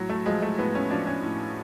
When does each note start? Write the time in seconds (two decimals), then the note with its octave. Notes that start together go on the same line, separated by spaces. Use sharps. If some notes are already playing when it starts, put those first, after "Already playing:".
Already playing: A2 F#3
0.10 A3
0.26 F3 G#3
0.42 A3
0.58 A2 B3
0.75 C#4
0.90 F3 D4
1.07 C#4
1.23 A2